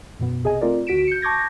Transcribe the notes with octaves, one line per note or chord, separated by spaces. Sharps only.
F#2 B2 B3
B1 C3 G#4 D#5 G#5
A3 C4 F4 A#4 D5
D2 F#4 B6 D7 E7
G6 C#7
A5 C#6 D6 G6 G#6 A#6